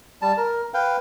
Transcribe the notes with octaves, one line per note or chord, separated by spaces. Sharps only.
G3 A5
A#4
B4 F5 G5